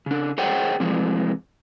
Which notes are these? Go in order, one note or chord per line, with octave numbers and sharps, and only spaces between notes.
C#3 D4
G#4 C5 C#5 D#5 F#5 G5
C3 E3 F3 G#3